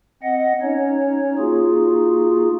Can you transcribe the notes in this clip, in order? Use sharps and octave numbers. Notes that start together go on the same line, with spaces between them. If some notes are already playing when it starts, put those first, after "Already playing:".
C4 D#5 F#5
C#4 D#4 C#5
A#3 D#4 F4 F#4 G#4